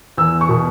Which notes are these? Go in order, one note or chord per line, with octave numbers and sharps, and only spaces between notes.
E2 E6
C#6
B2